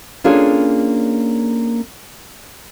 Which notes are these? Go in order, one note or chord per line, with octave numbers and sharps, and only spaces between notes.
A#3 C#4 D4 F4 G#4 A4